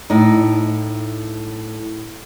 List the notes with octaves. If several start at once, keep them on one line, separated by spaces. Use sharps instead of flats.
A2 D#4